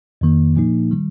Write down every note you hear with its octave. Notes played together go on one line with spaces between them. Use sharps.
F2 D#3 A#3
A#2 F3 A#3 D#4
D#3 G3